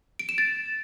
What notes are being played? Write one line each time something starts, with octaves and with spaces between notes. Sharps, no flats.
D7
E7
A6